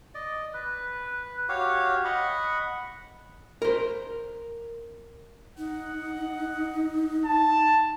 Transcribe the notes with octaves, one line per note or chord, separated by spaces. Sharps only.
D5 D#5
B4
F#4 G4 C#5 F5
D#5 F#5 B5 C#6
A#4 C5
D#4 F#5
A5